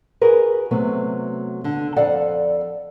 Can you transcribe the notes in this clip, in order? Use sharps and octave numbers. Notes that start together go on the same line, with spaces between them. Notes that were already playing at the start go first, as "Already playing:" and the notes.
F#4 G#4 A#4 B4
C3 F#3 A3 B3
D3
F2 A4 D5 F5 F#5